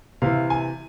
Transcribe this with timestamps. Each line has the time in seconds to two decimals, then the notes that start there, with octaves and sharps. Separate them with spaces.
0.22 C3 E3 F5
0.50 G#5